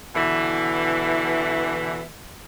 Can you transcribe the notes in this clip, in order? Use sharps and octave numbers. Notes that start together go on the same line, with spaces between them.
B2 D3 E3